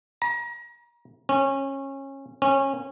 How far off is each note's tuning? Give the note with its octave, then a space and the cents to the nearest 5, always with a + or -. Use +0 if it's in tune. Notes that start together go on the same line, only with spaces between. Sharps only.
A#5 +35
C#4 -25
C#4 -25